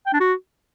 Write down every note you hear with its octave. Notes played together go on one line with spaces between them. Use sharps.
G5
D4
F#4